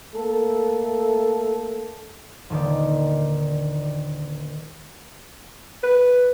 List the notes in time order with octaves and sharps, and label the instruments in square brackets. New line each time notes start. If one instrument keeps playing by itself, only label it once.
[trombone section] A3 A#3 A4
[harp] D#1 D3 D#3 D5
[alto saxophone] B4